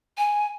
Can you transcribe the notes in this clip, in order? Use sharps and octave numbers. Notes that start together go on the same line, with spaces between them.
G#5